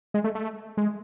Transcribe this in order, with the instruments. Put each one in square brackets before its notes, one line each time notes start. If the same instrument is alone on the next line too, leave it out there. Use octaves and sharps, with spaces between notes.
[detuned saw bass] G#3
A3
A3
G#3